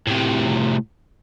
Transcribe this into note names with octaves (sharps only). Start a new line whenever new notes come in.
A2 C3